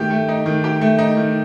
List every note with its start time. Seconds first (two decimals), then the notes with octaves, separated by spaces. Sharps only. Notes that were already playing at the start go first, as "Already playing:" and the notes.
Already playing: D#3 A3 G4
0.10 A3
0.28 D#4
0.46 D#3
0.64 G4
0.81 A3
0.98 D#4
1.17 D#3